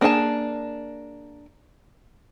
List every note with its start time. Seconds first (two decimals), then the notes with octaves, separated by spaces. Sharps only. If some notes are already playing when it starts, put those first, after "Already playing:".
0.01 A#3 D4 G#4 G#5 A5